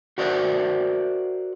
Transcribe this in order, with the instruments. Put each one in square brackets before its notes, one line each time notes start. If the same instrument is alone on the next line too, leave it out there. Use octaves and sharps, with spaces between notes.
[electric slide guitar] F#4 A#4 C5 D5 E5 F#5